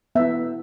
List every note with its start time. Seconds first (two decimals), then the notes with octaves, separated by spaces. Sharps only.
0.15 B3 E4 E5